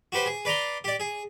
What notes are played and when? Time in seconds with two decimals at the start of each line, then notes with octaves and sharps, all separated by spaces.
0.12 F#4 G4 B4 C5
0.26 G#4
0.45 B4 D5 A#5 C6
0.84 G4 D5
1.00 G#4